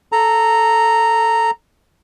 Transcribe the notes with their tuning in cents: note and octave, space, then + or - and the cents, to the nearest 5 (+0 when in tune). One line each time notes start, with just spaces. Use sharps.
A4 +0 A#5 -10